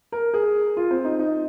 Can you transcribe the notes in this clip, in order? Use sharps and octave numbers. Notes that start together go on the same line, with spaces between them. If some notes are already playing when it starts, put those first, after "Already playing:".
A#4
G#4
F4
C4
D#4
D#4